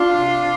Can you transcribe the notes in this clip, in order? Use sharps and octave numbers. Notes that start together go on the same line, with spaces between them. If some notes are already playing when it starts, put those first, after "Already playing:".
Already playing: D4 F4
C3